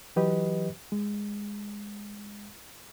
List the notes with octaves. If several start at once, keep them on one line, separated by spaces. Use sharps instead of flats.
E3 F#3 G4 B4 D#5
G#3